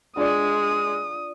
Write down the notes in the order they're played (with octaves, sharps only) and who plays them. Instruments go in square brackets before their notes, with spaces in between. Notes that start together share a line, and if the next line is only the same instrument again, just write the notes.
[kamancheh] G#3 [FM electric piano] D4 F4 D5 [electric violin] D#6